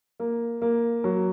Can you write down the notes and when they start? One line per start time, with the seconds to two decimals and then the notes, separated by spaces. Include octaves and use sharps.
0.20 A#3
0.62 A#3
1.04 F#3